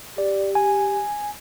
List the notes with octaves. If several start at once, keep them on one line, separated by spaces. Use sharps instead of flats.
G4 D5
G#5